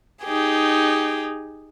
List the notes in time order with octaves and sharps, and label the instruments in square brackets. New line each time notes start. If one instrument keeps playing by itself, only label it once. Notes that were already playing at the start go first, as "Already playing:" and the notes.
[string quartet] D#4 G4 G#4